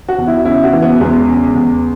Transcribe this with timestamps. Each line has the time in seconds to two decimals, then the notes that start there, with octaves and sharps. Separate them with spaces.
0.09 F#4
0.18 E2
0.27 E4
0.45 C#3 E4
0.64 F#4
0.73 E3
0.82 B3
1.00 E2 G#3
1.28 C#3
1.55 E2